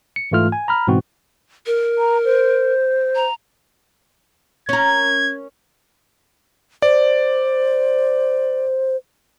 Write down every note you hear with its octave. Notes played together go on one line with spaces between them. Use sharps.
C#7
G#2 E3 A3 F4 F6
G#5
A#5 B5 F6
G#2 B2 E3 C4 F#4
A#4
A#5
C5
A#5
C#4 A#4 G#6
C5 D5